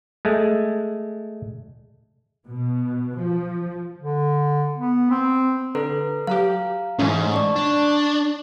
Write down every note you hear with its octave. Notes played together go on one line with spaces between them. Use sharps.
G#3 A3
B2
F3
D3
B3
C4
D3 A4 B4 A#5
F#3 G4 F5 A#5
G#2 E3 A3 C#4
D5 A5 C#6
D4